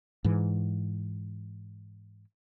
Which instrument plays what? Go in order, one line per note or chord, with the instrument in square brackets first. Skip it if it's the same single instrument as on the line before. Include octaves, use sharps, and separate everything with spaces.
[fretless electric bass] G#2 E3